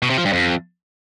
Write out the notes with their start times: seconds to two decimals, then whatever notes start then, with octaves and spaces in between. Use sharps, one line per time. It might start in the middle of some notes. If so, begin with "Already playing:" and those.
0.02 B2
0.10 C3
0.18 F3
0.25 G2
0.33 F2